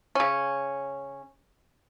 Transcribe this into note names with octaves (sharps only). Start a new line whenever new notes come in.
C#3 C#4